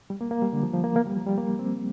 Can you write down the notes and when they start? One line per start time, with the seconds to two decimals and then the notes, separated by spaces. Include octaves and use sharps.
0.10 G3
0.21 A#3
0.31 A#3
0.42 G3
0.53 D3
0.63 F3
0.73 F3
0.84 A#3
0.96 A#3
1.05 G3
1.17 F3
1.27 G3
1.38 A#3
1.59 C4